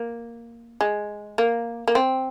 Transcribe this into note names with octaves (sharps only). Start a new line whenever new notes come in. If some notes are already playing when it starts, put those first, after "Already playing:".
Already playing: A#3
G#3
A#3
A#3
C4